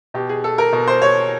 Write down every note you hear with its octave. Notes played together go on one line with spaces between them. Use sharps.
B2 G4
G#4
A4
A#4
B2
C5
C#5